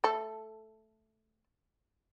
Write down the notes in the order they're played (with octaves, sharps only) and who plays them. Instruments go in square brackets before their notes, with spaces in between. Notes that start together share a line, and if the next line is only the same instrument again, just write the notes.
[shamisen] A3 A4